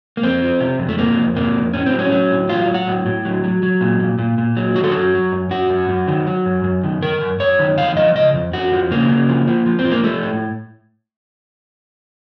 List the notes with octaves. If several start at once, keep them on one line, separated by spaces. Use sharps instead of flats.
A#3
F2 C4
F3
C3
F2
A3
C3 A#3
F2
C3 A#3
F2
A2 C#4
C4
F#3
C#4
F#3
A2
F#3 F4
F#3
F#4
A2
A2
F#3
F#3
F#3
A#2
A#2
A#2
A#2
F#3
D#3 F#4
A4
F#2 F#4
F#3
F#2
F#2 F#4
F#2
F#2
D#3
F#3
F#2
F#2
D#3
D#3 A#4
F#2
F#2 C#5
D#3
F2 F5
F3 D#5
C#3 D#5
F2
F2 F#4
F3
C#3 A#3
C#3
F3
F3
F3
C4
F3
A#3
F3 A3
A2